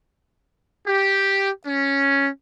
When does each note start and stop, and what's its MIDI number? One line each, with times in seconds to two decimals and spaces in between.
0.87 1.49 67
1.66 2.28 61